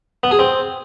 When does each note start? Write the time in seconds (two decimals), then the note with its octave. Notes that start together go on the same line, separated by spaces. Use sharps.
0.23 B3
0.31 G#4
0.39 C4